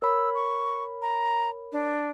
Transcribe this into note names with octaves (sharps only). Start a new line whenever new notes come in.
A#4 C#5 B5 E6
C#6
A#5
D4